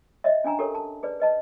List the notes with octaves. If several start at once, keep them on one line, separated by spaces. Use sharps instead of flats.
C#5 D#5 E5
C#4 D4 G#5 A#5
G4 A4 A#4 C#5
A5
G#4 B4 D5
B4 D#5 A5